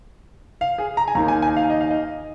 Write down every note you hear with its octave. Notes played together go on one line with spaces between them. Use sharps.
F5
G#4
A#5
G#5
D#2 D#3 A#3 D#4 A#5
G#5
G#5
F5
D#5
F5
D#5